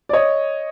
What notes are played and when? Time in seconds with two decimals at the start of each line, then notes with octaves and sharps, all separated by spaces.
0.09 D5
0.13 C#5 D#5